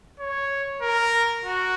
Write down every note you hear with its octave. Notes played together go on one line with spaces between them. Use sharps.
C#5
A#4
F#4